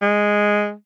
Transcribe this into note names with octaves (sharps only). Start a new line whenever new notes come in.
G#3